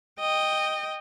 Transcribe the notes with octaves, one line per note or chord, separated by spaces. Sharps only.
D#5 G5